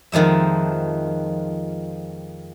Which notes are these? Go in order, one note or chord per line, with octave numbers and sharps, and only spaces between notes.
F2 D#3 F3 G#3 E5